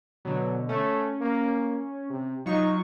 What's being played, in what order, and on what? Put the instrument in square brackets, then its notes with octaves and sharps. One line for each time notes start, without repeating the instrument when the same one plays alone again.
[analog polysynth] B2 D3 [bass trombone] F#3
[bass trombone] A3 [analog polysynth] C#4
[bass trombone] A#3
C3
[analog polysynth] F#3 F4 C#6 [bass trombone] D#4